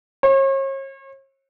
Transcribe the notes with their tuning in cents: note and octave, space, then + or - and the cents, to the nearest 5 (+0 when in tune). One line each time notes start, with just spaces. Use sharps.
C#5 -40